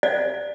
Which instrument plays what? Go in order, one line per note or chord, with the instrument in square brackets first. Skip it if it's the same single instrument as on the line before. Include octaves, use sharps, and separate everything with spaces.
[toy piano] D5